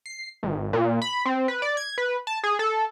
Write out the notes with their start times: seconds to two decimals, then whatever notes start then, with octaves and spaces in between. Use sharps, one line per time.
0.06 C7
0.43 G#1
0.73 A#2
1.02 B5
1.26 C4
1.48 B4
1.62 D5
1.77 G#6
1.98 B4
2.27 A5
2.44 G#4
2.59 A4